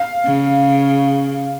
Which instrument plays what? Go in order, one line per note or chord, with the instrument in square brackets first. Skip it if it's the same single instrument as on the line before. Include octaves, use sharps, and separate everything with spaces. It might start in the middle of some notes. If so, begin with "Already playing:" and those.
Already playing: [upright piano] F5
[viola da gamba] C#3